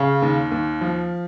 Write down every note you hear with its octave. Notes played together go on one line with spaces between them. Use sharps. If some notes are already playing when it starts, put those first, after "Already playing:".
Already playing: C#3 F5
D#2
D#2
F3